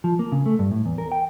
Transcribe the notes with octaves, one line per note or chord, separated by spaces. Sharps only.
F3
A#3
C#3
A3
G2
A2
E2
A#4
G5